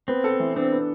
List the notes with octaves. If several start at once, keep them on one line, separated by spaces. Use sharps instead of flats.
B3 C4
A4
E3
C4 D4
B3